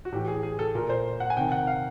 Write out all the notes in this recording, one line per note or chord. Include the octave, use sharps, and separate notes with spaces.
F#4
A2 E3 G4
G#4
G#4
A4
A#2 A#4
C5
F#5
G#5
C3 D#3 G5
F#5
F5